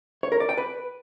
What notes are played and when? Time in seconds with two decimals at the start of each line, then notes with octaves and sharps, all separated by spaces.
0.23 C#5
0.32 A#4
0.40 D5
0.49 G5
0.57 B4